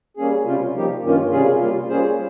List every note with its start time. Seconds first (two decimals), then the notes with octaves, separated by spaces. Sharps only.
0.17 G3 A#3 C#4 G#4
0.45 C3 G3 C#4 F4
0.75 F3 A#3 D#4 G4
1.03 G2 D#3 A#3 C#4 F4
1.31 C3 G3 C#4 F4 G#4
1.60 G3 A#3 F4
1.89 G3 A#3 C#4 G#4 C5